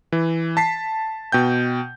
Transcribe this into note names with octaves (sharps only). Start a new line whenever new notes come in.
E3
A5 B6 C7
B2 G5 G6